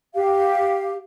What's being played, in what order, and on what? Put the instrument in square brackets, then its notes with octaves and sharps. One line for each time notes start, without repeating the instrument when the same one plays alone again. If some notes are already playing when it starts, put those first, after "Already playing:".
[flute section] G4 F5